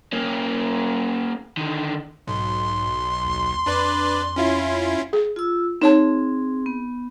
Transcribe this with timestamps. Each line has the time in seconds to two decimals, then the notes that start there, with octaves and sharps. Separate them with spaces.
0.13 A#3 C#4
1.57 D3 D#3
2.28 B1 G#2 C6
3.24 D#2
3.66 F2 D4 B4 D5
4.36 C#4 E4 F4
5.13 G#4
5.36 F4 E6
5.81 C4 D#4 G#4 C#5 A5
6.66 B3